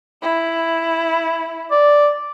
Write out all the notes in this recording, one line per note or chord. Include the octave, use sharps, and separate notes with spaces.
E4
D5